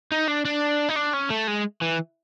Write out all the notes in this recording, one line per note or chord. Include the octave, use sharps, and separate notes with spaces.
D#4
D4
D4
D#4
D4
C#4
A3
G#3
E3